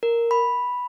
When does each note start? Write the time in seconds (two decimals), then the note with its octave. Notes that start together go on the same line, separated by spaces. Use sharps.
0.03 A#4
0.31 B5